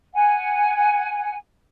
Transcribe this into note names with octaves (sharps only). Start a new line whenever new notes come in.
F#5 G#5